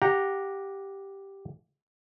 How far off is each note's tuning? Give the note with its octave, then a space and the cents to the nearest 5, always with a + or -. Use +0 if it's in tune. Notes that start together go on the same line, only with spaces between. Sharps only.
G4 +0 F#5 -15 A#5 +0